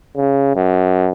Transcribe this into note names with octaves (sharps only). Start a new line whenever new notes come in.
C#3
F#2